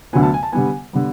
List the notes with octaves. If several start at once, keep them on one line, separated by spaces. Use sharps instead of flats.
D2 D3 F#3 B3 G#5
A5
G#5
A5
D3 G3 B3 G#5
D3 G3 B3